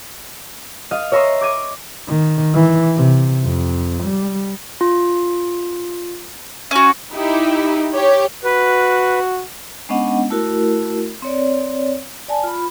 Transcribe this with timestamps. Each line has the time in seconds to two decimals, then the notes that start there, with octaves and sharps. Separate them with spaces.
0.91 D#5 F5 D#6
1.12 C#5 E5 A#5 C6 C#6 D#6
1.41 D6 G#6 D#7
2.08 D#3
2.54 E3
2.97 C3
3.45 F2
4.04 G3
4.81 F4
6.71 C#4 F#4
7.12 D#4 E4 G4
7.93 G4 C#5
8.44 F#4 B4
9.89 G#3 B3 C#4 D4 D#5 F#5
10.30 A3 E4 F#4 A#4
11.22 C4 C#5 D5
12.28 D5 G#5 A5
12.44 F4 B5